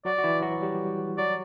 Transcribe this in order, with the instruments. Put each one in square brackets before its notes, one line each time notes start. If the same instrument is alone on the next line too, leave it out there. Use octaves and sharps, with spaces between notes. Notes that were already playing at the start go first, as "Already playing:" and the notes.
[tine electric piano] F#3 F#4 [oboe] D5
[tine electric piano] F#4
E3 E4
F#3 F#4
G3 G4
[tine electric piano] F#3 F#4 [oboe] D5